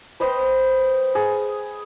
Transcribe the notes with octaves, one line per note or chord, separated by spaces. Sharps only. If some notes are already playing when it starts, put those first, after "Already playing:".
B4 C5 D#5 G5
G#4